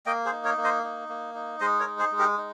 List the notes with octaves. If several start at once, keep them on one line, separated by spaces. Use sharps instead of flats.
A#3 D#5 G5
G#4 C5
D#4
A#4 C#5
A#3
C5 D#5
D#4
A#3
D#4
G#3 C5 D#5
A#4 C#5
D#4
G#4 C5
G#3
G4 A#4
D#4